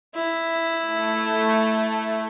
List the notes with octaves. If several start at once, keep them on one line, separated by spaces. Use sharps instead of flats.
E4
A3